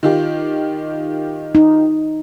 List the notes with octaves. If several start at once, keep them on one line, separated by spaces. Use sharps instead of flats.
D#3 F4 G4
D#4